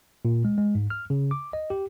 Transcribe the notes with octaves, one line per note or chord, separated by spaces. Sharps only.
A#2
G#3
G#3
G#2
F6
C#3
D6
D#5
G4